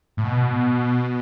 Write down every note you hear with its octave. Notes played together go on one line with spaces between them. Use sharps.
A2
B2